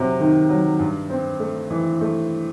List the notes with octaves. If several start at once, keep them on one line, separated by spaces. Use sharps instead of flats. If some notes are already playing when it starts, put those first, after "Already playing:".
Already playing: C3 F#3
D#3
F#3
G2
C4
A3
E3
A3